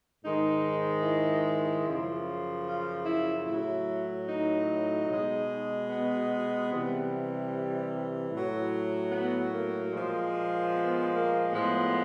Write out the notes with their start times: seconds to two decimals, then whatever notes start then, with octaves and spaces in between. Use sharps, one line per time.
0.22 G#2 D#3 G#3 D#4
1.03 E4
1.84 F#2 C#3 F3
2.65 F4
3.05 E4
3.45 A2 F#3 E4
4.26 D#4
5.07 B2 G#3
5.88 B3
6.69 C3 E3 G3
8.30 A2 F#3
9.11 B3
9.51 A#3
9.92 A#2 F3 G#3
10.73 B3
11.13 A#3
11.53 A2 F3 G#3 B3